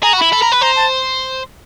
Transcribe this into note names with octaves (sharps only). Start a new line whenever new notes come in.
G#4 A#5
F#4
E4 B5
A4
A#4
B4
C5 A#5
A5